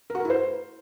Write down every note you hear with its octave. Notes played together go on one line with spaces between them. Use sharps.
A#4
F#4
A#4
E4
C5